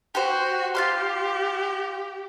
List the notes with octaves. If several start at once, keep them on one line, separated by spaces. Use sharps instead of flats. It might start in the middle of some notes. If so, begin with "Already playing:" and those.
F#4 G4 C5
F4 G4 F5 C6